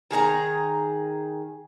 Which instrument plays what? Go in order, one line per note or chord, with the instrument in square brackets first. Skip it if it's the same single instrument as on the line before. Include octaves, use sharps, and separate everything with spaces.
[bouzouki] D#3 G#4 A#4 A#5